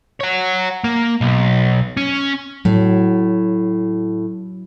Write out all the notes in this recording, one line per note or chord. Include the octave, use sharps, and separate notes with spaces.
C#5 F#5
A#3
B1
C#4
A2 F#3